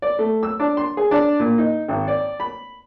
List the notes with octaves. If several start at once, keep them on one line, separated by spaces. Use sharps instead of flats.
D5
A3
E6
D4
C6
G#4
D4
A#2
D#4
G#1
D5
B5